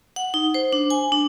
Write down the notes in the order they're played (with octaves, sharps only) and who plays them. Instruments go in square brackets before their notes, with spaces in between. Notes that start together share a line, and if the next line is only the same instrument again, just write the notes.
[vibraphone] F#5
D#4
C5
D4
G#5
D4